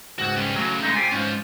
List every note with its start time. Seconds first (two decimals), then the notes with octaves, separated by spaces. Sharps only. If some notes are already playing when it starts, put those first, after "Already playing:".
0.18 C#2 G#2 F#4
0.37 G3 C#4
0.56 A2 C#3 F#3
0.83 G#3 A3 D#4
0.96 C3 F4 G4 G#5
1.12 G#2 F3 C#4 F4